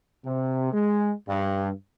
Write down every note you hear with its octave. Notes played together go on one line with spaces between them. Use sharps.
C3
G#3
G2